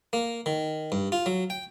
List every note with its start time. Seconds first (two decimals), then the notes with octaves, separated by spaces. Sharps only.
0.13 A#3
0.46 D#3
0.92 G2
1.12 F4
1.26 F#3
1.50 G5